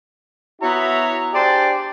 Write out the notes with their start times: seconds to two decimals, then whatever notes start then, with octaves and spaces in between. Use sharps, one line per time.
0.61 B3 E4 F#4 C#5 E5 A#5
1.33 D4 G4 G#4 C5 D5